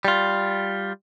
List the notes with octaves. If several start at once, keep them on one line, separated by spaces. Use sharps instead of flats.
G3 F4